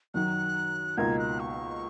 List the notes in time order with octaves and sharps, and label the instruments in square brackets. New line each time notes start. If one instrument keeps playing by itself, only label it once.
[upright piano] F#2 D#3 F#3 [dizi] F#6
[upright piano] C#2 B2 A#3 D#4 A#4 [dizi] G#6
[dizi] F#6
C#6